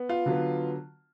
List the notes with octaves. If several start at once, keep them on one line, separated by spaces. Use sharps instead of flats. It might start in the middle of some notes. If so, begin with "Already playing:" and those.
Already playing: B3
F4
D3 F#3 B3